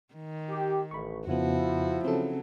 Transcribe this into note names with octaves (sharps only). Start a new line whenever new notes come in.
D#3
G4
A1 B5 C#6
F2 C#3 F3 B3 E4 F#4
C#3 F#3 C4 A4